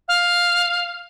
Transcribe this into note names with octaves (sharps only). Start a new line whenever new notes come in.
F5